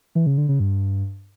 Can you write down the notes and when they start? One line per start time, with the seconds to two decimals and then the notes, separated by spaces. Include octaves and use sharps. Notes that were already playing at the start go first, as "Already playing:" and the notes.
0.15 E3
0.26 C#3
0.38 D3
0.49 C#3
0.60 G2